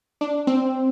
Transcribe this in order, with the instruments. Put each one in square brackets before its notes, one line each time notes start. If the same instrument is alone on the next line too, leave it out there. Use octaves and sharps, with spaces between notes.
[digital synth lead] D4
C4